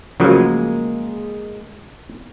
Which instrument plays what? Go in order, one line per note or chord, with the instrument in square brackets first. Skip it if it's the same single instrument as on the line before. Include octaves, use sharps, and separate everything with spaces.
[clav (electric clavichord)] C#3 F3 F#3 [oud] G#3 A#3